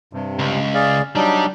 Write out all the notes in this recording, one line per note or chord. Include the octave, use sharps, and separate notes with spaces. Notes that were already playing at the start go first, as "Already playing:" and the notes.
G2 C3
C#2
G#4 D5 F5
F#3 G3 D4 D#4